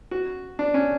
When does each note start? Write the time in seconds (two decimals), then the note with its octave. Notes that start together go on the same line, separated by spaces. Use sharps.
0.11 F#4
0.59 D4
0.74 C#4